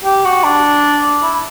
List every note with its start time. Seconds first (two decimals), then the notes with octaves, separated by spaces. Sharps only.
0.04 G4
0.25 F#4
0.44 D4
1.22 E4